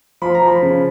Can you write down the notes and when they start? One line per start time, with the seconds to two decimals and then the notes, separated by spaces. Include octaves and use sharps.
0.22 F3 B5
0.34 A#5
0.42 F3
0.48 B5
0.62 C#3